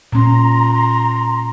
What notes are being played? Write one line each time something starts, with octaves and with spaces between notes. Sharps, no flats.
A#2 C#4 A#5 C6